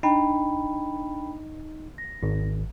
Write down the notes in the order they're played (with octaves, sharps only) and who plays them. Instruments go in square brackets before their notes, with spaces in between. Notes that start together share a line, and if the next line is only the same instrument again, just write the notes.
[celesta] D4 G5 B5 [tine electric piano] D#4
[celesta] A#6
[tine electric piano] G#1